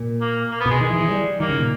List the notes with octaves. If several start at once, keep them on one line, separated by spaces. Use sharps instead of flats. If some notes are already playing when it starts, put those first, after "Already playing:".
Already playing: A#2
A#3
A#3
B3
B2 G#3
D#3 G#3
E3
E3
G3
D#3 A#3
C#3
A#2